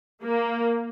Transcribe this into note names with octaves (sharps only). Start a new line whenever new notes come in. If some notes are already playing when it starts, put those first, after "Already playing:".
A#3